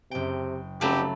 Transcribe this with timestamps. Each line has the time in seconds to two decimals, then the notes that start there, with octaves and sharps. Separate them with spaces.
0.11 F#1 C3 G5
0.81 F1 C#3 F#3 A3 G4 A5 B5